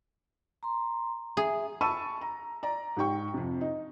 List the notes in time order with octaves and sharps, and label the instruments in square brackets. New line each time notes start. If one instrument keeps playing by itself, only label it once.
[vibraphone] A#5 C6
[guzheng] G#4 [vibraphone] E5
[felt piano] A5 B5 C#6 E6 D#7
A#5
D5 A#5
G#2 G4 G5 C#6
F2 C3
D#4